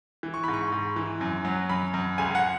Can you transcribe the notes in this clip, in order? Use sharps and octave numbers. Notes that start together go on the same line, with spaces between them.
E3
C#6
G#2 B5
C#6
G#2
E3
F#2
F#3
F#2 B5
F#2
C#2 G#5
F#5